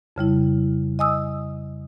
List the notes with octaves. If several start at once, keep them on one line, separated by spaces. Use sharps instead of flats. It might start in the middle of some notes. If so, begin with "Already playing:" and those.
F2 C#3 G3 E4
D#5 G#5 D#6 E6